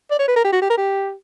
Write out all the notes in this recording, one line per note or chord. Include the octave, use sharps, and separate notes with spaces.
D5
C#5
B4
A#4
G4
F#4
G4
A#4
G4